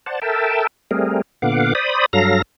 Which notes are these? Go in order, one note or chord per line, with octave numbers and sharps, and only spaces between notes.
C5 D5 F#5 A5
A4 A#4 E5 G5 A5
G3 A3 C4 G#4 A#4
A#2 D3 B3 F5 F#5 D6
C5 D5 B5 D#6
G2 F#3 A4 F5 A#5 A#6